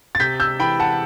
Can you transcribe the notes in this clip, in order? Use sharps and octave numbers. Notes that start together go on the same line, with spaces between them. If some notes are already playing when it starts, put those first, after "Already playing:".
A6
C3 G6 B6
E6 G6
E3 G5 B5
F#5 A5